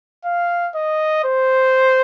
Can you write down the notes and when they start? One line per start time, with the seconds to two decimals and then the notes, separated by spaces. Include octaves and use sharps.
0.25 F5
0.75 D#5
1.24 C5